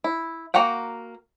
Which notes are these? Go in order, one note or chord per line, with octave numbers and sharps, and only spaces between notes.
E4
A#3 F#4 A#4 F#5 G5